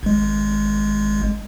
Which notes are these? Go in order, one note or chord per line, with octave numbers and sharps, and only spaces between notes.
G#1 G#3